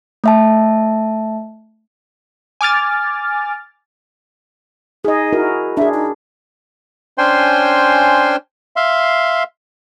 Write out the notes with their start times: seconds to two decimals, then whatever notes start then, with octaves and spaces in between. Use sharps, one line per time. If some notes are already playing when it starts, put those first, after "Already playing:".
0.24 A3 E5 A5
2.61 G#5 D6 F6 A6
5.05 D#4 G#4 D#5
5.33 E4 F#4 A#4
5.77 D4 G#4 E5
5.94 D#4
7.18 C#4 D4 C5 G5 G#5 C6
8.76 E5 F5 C6